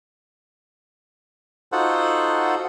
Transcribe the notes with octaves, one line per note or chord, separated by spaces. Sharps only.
D#4 F4 F#4 A4 C5 F#5